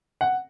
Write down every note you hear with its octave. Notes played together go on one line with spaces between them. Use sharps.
F#5